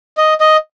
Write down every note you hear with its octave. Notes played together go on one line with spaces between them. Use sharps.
D#5
D#5